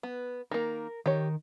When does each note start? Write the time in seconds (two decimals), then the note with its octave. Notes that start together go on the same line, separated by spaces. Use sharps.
0.03 B3
0.51 D#3 A#3 A#4
1.06 D#3 G4 A#4 C#5